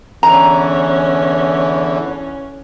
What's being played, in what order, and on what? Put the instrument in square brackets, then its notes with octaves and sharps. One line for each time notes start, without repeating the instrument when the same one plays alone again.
[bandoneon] E2 D3 E3 [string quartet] C#4 [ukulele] A#5